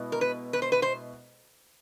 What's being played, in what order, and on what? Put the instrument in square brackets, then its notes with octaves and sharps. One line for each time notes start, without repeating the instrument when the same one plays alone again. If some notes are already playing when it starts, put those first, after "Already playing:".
Already playing: [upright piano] B2 G#3 B3 E4
[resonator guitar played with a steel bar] A#4
B4
B4
C5
B4
C5